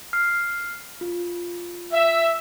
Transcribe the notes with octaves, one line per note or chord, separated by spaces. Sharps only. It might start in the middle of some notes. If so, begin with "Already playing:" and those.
F6 C7
F4
E5